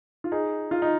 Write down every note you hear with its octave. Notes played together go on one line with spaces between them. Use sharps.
F4
D#4 G#4
F4
D#4